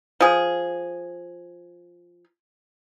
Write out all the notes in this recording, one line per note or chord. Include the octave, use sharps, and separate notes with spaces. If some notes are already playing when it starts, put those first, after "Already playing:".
F3 G#4